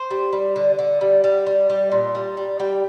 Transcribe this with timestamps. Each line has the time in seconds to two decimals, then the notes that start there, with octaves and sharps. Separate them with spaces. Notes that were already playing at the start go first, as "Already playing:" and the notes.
Already playing: C5
0.11 G3
0.33 G3
0.56 D3
0.79 D3
1.01 G3
1.24 G3
1.47 G3
1.70 G3
1.92 A#2
2.15 G3
2.37 G3
2.60 G3 G5